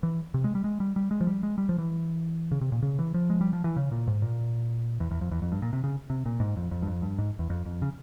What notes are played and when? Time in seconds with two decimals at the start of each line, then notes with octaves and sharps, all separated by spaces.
0.03 E3
0.34 C3
0.44 G#3
0.55 G3
0.64 G#3
0.80 G3
0.96 G3
1.11 G#3
1.21 F3
1.27 G3
1.43 G#3
1.58 G3
1.69 F3
1.78 E3
2.51 C#3
2.61 C3
2.72 A#2
2.82 C#3
2.99 E3
3.14 F3
3.30 G#3
3.41 G3
3.53 F3
3.64 E3
3.77 C#3
3.91 A#2
4.07 G#2
4.22 A#2
5.00 E2
5.11 E2
5.21 F2
5.31 E2
5.42 F2
5.52 G2
5.62 A#2
5.73 C3
5.84 C#3
6.10 C3
6.25 A#2
6.40 G#2
6.57 F2
6.71 F2
6.82 G2
6.87 F2
7.02 G2
7.18 G#2
7.39 E2
7.50 F2
7.66 F2
7.82 C#3